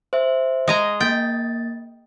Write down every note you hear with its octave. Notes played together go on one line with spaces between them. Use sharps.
C5 E5
G#3 D#5 A#5
A#3 G5 A6